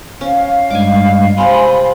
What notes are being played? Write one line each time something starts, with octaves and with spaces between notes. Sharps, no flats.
C#4 F5
G2 G3 G#3 G#5 D6
C3 C4 G#5 B5 C6